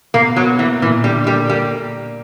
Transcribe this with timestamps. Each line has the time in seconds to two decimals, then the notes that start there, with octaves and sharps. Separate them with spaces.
0.14 B2 A#3
0.36 F#3 B3
0.59 E3 A#3
0.82 A#2 E3
1.04 D3 G3
1.26 G3 A#3
1.49 G3 A#3